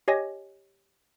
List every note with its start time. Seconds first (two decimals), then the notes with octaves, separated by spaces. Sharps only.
0.08 G4 C#5 D#5 G#5 A#6